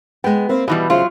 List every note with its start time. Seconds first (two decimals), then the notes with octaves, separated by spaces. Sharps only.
0.24 G#3 B3 G5
0.49 A#3 C4 B4
0.68 B2 E3 G3 D#5
0.90 E2 C#3 F#3 F4 C5